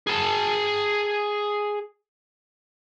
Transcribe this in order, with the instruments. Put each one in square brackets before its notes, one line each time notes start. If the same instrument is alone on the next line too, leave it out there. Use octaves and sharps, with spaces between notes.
[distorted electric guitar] G#4 A5